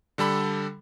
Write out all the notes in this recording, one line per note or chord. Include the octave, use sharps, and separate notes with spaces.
D3 G3 A4 B5